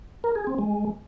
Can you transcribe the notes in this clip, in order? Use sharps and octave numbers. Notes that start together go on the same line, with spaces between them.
A#4
G#4
C4
G#3